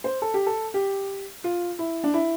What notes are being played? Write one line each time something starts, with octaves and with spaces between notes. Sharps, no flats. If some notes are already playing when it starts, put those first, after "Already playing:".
C5
A4
G4
A4
G4
F4
E4
D4
E4